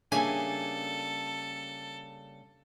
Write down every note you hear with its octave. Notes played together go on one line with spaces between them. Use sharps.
C#3 G3 A#3 D4 G#4 A4 E5 G#5